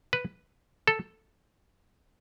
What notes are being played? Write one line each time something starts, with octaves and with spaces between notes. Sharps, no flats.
B4
A4